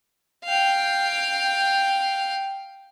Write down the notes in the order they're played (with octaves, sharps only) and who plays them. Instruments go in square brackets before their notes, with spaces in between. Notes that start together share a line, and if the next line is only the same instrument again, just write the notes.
[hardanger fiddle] F5 G5